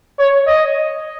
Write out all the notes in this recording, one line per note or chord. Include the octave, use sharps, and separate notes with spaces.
C#5
D#5